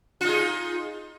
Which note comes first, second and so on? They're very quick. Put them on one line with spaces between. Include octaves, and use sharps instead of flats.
F4 D#4 G#4